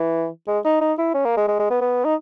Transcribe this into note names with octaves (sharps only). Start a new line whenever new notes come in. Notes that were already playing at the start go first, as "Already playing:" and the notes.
Already playing: E3
G#3
D#4
D#4
E4
C#4
A#3
G#3
G#3
G#3
B3
B3
D#4